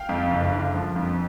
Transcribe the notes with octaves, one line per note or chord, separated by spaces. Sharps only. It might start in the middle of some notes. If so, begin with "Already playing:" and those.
Already playing: F5 G5
F2
F#1
D3
F3
F2